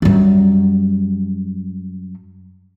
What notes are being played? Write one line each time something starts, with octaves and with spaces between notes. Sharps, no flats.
F#2 G3